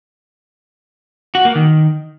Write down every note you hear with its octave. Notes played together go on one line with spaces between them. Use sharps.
F#4
A#3
D#3